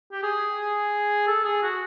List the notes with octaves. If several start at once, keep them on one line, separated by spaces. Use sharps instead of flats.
G4
G#4
A4
G#4
F#4